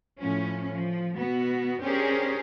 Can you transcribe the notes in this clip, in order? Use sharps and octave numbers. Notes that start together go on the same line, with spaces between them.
A2 F3 C#4
F3
B2 B3 F#4
C#4 D4 G4 G#4 A#4 C5